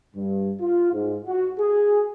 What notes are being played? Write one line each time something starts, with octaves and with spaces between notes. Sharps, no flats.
G2
F4
G#2
F#4
G#4